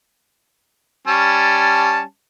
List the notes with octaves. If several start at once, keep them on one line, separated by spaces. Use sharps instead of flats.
G3 C#4 A5